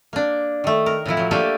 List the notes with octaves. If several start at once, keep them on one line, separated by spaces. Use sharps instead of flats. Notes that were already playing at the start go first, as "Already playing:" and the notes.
A#3 D4
D#3 A3
A#4
A2 E3 F3 E4
F3 F#3
A3 A#3 D4 G4 A4 G#5